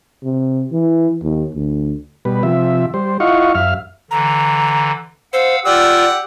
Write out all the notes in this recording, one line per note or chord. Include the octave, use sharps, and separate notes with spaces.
C3
E3
D#2
D2
B2 G3 B4
C3 F3 E5
G3 C5
E4 F4 D#5 F5 F#5 C#6
F#2 E5 F5 F6
D3 E3 A#5
C5 F5 F#5 E6
F4 G4 A#4 D5 F#5 E6